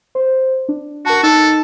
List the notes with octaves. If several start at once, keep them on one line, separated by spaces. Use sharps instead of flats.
C5
D4
F#4 A#4 A5
D#4 A4 A5